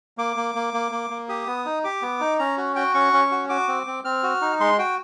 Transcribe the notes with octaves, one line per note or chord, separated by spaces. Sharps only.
A#3 D6
A#3
A#3
A#3
A#3
A#3
G4 D#6
B3
D#4
G4 D6
B3
D#4
C#4 A#5
F#4
F#4 G5
C#4 C#6
C#4
F#4
F#4 D6
C4
C4
C4 F6
F#4
D#4
G#3 C6
F#4 G5